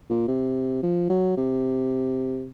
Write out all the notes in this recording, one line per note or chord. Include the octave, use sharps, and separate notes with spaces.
A#2
C3
F3
F#3
C3